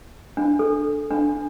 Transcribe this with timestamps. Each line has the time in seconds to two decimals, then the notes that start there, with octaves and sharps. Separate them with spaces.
0.37 D4
0.59 A4
1.11 D4